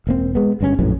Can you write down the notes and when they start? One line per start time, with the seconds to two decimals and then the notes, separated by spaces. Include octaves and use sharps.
0.07 E1 A#3 C4
0.35 G#3 B3
0.61 G1 G2 C4 C#4
0.79 A#1 F#2 A2 E3